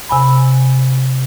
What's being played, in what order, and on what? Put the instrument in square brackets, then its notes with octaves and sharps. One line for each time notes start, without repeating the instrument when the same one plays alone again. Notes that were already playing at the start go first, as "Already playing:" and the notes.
[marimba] C3 G#5 B5